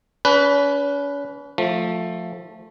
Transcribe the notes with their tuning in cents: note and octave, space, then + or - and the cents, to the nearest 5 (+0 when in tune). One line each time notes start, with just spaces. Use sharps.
C#4 +45 B4 +0
F3 +15 A3 +0